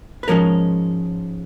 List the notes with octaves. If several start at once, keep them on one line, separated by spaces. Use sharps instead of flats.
B4
G#2 F3 G#3 C#4 A#4 C#5